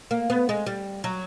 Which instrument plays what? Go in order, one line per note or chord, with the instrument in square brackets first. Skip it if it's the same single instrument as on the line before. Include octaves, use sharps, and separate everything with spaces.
[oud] A#3
B3
G#3
G3
F#3